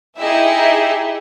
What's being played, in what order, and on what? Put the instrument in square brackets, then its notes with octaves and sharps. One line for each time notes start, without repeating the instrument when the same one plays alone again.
[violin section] D#4 E4 G4 G#4 D#5 E5